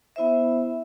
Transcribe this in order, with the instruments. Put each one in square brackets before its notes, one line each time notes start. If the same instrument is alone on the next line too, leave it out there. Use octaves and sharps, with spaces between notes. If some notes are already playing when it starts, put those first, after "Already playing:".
[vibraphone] B3 E4 C5 E5